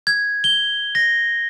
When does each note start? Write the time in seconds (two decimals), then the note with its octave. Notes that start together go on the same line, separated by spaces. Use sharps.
0.07 G#6
0.44 G7
0.95 A#6